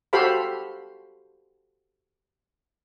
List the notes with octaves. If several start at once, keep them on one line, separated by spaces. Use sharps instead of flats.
F#4 G4 A4 C5 F5 B5